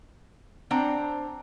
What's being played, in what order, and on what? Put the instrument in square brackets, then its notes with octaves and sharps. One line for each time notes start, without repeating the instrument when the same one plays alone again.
[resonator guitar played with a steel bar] C4 D4 C5 F#5 A#5